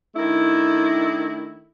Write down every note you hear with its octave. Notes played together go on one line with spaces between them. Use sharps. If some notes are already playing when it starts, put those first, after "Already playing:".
D#3 A3 D4 E4